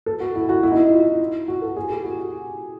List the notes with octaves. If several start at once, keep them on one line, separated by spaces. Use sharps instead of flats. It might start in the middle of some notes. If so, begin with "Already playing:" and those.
A4
F#4
E4
F#4
E4
D#4
E4
F4
F#4
A4
G#4
G4
F#4
F#4